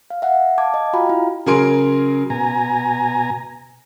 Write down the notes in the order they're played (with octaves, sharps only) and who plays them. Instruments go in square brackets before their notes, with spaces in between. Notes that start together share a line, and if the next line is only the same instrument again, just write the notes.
[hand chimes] F5
E5 F#5
F5 A5 D6 G#6
D#5
F4 F#4 F5 G5 A#5 B5
E4
[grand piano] C#3 F#3 A#4 G#5 C6 D7
[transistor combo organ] B2 G#5 A#5